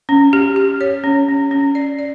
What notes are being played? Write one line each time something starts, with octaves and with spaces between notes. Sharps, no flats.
C#4
G4
G4
C#5
C#4
C#4
C#4
D5
D5